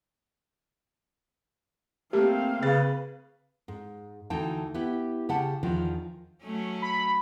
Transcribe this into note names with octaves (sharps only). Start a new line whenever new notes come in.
A3 A#3 C4 G4 F5
C#3 B4 F#6 A6
G#2
D2 E3 D#4 G5 A5
B3 E4 G4
C#3 G4 F#5 A5
E2 D#3 F3 D4
F#3 A3 C#4
B5